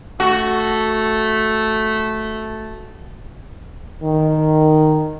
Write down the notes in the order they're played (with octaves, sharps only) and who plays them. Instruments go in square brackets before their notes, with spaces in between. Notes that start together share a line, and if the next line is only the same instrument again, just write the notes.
[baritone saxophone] A3 [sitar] F#4
[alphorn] D#3